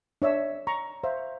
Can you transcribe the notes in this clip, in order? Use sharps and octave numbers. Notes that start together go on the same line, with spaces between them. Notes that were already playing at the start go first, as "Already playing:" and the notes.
D4 C#5 E5 E6
A#5 C#6
C5 E5 F5